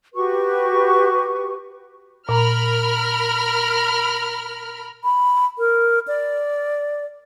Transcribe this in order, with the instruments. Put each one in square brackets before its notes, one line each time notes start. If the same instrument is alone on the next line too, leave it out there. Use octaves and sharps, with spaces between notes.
[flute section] F#4 G4 B4 C#6
[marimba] A#2 A#5 [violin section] A#4 B5 F6
[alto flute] B5
A#4
D5